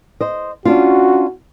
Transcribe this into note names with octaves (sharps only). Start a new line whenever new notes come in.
C5 D#5
C#4 D4 F4 F#4